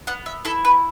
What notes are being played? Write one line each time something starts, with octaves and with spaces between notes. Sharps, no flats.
B3 F#5
E5
E4 A4
B4